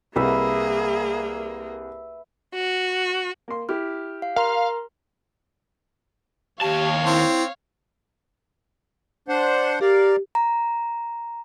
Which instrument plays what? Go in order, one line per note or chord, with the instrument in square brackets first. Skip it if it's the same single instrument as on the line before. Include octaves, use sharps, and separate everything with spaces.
[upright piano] C2 [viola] A#3 G#4 [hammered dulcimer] B4 E5 F#5
[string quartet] F#4
[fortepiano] A#3 C6
[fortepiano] E4 G4 [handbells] F6
[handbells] F5
[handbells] A#4 A#5 C6 [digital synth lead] F5
[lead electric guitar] D#2 A5 [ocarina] G4 [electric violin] C#5 F5
[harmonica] C4 [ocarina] E4
[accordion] D4 C5 F#5
[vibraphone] G4 [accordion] A#4 D5 F5
[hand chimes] A#5